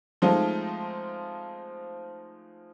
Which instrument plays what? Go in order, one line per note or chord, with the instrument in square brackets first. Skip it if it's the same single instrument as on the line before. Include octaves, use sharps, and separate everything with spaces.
[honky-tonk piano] F3 G#3 A3 C4 D#4 F4